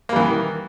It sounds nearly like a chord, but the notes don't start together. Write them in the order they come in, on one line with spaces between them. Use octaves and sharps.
A#3 G3 E3 D#3